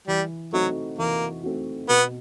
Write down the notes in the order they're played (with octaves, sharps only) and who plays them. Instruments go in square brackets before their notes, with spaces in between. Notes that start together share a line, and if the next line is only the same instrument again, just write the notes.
[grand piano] E3 [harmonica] G3
[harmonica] F#3 [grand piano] A3 C4 D#4 F#4
[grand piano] E3 [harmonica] A#3
[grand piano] A3 C4 D#4 F#4
[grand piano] B2 [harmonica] B3